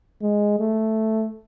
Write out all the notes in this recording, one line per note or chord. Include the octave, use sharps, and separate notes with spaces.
G#3
A3